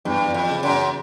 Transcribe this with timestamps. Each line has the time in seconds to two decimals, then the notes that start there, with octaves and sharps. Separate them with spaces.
0.05 E2 G2
0.27 E2
0.34 F2
0.49 C#3
0.63 F#2
0.70 E2